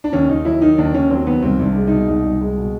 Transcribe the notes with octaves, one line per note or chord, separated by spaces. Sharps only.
D4
D#2 C#4
D#2 D#4
F#3 E4
D#3 D#4
D#2 D4
D#2 C#4
F#3 C4
D#3 B3
C2 C4
C2
D4
G#3
B2 D#4
C2 D#4
C2
G#3
B2